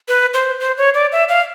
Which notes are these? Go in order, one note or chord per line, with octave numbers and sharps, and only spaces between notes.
B4
C5
C5
C#5
D5
E5
F5